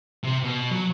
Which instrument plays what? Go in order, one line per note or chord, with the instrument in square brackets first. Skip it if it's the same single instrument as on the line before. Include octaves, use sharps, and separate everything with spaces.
[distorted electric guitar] C3
B2
F#3